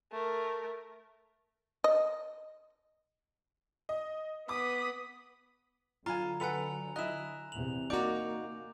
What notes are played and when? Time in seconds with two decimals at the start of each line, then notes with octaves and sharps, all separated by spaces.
0.12 A3 A#4
1.84 D#5
3.89 D#5
4.49 B3 D6 D#6 B6
6.06 D3 F#3 F4 G#5 A#5 B5
6.40 A4 B4 F#5 G#5 F7
6.96 E4 D#5 F#6 E7
7.52 E2 C3 F7 F#7
7.90 A#3 D#4 F#4 D5 A#5 D6 G6